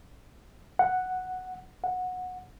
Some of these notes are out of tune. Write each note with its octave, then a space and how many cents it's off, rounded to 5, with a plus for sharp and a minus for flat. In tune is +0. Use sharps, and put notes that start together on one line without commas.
F#5 +0
F#5 -15